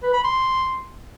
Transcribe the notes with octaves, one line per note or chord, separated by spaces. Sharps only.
B4
B5
C6